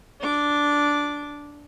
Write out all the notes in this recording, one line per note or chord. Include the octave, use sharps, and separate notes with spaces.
D4 D6